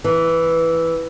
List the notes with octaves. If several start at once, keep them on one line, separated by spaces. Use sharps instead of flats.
E3